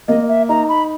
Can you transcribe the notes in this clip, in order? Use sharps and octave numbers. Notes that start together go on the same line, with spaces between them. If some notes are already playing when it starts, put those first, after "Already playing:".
A#3 D#5
E5
D#4 A#5
B5